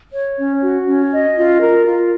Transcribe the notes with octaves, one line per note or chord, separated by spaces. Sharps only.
C#5
C#4
F#4
C#4
D#5
F4
A#4
F4